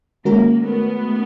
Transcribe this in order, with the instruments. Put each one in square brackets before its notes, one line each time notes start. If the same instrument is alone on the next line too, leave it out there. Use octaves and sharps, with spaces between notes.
[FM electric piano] D#3 G#3 C#4 F#4 A#4 [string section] A#3
[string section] A3 B3